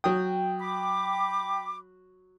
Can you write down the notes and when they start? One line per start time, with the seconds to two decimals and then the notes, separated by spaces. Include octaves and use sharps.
0.04 F#3 G5 D#6
0.60 B5 D6